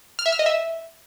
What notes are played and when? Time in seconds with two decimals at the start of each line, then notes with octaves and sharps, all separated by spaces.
0.19 F6
0.26 E5
0.32 F6
0.39 D#5
0.46 E5